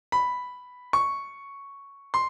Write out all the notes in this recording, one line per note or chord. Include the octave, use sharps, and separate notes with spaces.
B5
C#6
C6